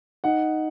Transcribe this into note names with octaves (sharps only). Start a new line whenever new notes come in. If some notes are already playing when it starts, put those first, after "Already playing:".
D#4 F#5